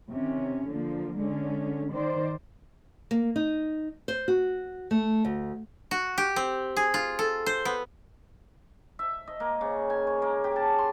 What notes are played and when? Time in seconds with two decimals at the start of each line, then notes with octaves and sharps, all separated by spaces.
0.11 C3 D#3 C#4
0.68 D3 F3 A#3
1.16 D3 G#3 C#4
1.92 D#3 C5 D5
3.11 A#3
3.36 D#4
4.08 C5
4.28 F#4
4.91 A3
5.25 D2
5.91 F#4
6.18 G4
6.36 C4
6.77 G#4
6.94 F4
7.19 A4
7.46 C5
7.65 B3
8.99 E5
9.27 D#5
9.40 A#3
9.61 C#3
9.90 G#5
10.07 C#5
10.22 A#3
10.44 G4
10.56 A5
10.78 C6